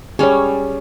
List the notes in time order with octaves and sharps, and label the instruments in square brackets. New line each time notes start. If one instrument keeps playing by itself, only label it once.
[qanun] G3 C#4 [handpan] G#4 C#5